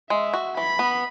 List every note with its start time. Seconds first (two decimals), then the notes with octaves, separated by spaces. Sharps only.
0.10 G#3 E5
0.33 F#4
0.57 E3 B5
0.79 B3